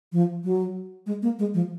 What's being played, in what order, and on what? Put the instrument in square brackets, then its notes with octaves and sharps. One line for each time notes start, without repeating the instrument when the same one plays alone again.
[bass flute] F3
F#3
G#3
A#3
G#3
F3